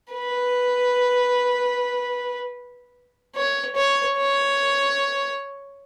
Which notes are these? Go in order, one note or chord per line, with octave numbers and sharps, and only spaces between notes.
B4
C#5
C#5
C#5